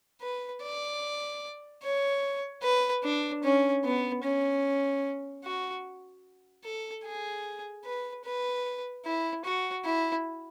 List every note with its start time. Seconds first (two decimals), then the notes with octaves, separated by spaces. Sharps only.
0.22 B4
0.63 D5
1.83 C#5
2.63 B4
3.04 D4
3.44 C#4
3.84 B3
4.24 C#4
5.45 F#4
6.64 A4
7.05 G#4
7.85 B4
8.25 B4
9.05 E4
9.45 F#4
9.85 E4